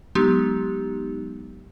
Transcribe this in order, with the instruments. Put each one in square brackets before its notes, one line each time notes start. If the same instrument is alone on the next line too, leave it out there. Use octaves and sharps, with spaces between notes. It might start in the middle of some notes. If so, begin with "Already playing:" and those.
[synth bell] F#3 G#3 B3 D#4 G4